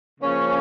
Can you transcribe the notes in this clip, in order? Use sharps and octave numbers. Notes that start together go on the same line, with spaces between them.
C#3 F3 A#3 C#4